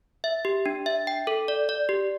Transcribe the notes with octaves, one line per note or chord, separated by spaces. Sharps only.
E5
G4
D4
E5
G5
A4
D5
D5
G4